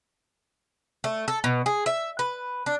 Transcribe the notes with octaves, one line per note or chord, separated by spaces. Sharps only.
A3
A4
B2
G#4
E5
B4
D4